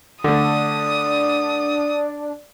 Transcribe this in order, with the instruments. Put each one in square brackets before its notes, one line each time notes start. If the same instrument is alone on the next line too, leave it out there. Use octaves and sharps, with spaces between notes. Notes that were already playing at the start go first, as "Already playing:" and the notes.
[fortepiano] D3 A3 [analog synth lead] D4 [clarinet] D5 [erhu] D#6